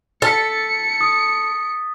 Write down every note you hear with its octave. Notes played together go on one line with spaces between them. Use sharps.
A4 A6 B6 C#7
D#6